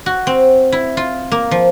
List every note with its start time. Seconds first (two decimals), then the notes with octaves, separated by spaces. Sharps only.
0.06 F#4
0.27 C4
0.72 E4
0.97 F4
1.32 A#3
1.51 F3